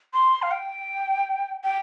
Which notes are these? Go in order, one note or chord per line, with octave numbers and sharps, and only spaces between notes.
C6
F5
G5
G5